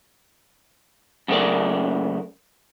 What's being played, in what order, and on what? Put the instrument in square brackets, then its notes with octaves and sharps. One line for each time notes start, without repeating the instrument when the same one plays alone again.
[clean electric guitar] F#2 C#3 A3 B3 A#4 D5